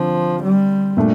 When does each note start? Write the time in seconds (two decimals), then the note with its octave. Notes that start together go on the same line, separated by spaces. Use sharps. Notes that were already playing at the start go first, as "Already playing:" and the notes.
Already playing: D3 F3 C4
0.43 G3
0.97 A#2 A3 D4